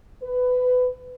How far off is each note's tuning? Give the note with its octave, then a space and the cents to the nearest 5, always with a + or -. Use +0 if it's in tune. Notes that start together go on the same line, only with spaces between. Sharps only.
B4 +20